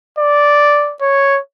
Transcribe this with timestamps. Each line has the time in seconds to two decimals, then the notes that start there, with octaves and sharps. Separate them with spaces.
0.19 D5
1.02 C#5